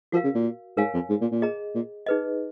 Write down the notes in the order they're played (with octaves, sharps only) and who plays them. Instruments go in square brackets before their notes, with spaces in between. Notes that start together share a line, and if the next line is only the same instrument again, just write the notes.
[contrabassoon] F3 [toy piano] F#4 A#4 F5
[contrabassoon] C#3
A#2
[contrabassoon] G#2 [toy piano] A#4 C#5 F5 G#5
[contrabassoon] F2
G#2
A#2
A#2
[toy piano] G#4 D#5 A#5
[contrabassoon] A#2
[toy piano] D#4 G#4 B4 D#5